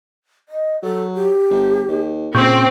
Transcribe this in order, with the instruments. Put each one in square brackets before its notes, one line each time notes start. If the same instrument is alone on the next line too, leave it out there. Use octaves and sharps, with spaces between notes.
[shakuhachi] D#5
[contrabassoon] F#3 [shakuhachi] A4
[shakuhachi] G4
[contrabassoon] G1
D#2
[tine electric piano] A#2 C#6 G6 [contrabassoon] C#3 [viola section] C4 [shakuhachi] G5